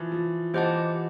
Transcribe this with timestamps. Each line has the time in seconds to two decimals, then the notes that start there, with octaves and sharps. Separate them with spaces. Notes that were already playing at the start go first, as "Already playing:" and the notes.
Already playing: E3 F3
0.12 F3
0.54 E3 G4 C5 D#5 F#5 A5